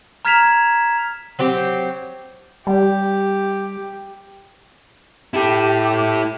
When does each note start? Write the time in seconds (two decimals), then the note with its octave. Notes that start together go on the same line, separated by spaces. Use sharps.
0.25 A#5 F6 G#6 B6 E7 F7
1.39 F#3 C4 G4
2.67 G3 G4
5.34 E4 G4 A4